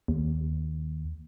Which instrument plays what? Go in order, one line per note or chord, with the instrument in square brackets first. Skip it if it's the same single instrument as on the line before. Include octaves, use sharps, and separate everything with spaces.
[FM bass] D#2